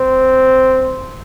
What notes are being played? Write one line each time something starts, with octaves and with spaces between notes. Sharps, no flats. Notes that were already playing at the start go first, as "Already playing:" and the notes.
Already playing: C4